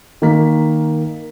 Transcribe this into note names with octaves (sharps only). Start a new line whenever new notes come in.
D#3 A#3 A#4 B6